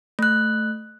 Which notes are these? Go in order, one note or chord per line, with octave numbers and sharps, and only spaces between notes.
A3 F#6